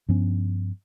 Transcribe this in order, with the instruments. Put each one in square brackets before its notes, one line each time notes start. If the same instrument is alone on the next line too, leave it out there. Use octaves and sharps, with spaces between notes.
[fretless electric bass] G2 F3 B3 C#4